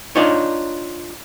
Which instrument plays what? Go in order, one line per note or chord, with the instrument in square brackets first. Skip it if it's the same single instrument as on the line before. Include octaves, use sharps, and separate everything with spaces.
[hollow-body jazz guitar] D4 D#4 F4 C#5